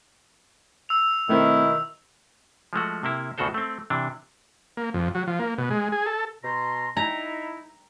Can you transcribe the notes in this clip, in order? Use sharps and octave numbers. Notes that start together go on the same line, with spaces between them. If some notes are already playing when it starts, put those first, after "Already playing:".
E6 F7
B2 D#3 A3 C4 E4
F3 G#3 A3 F#4
C3 A#3 E4
D2 B2 D#3 F#4 A4 C5
A3 C4
C3 E3 D4
A#3
F2
F#3
F3
A#3
B2
G#3
G#4
A4
B2 A#5 C6
D#4 E4 A#5